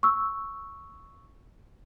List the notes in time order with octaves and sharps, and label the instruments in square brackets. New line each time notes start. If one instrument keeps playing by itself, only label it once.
[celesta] C#6 E6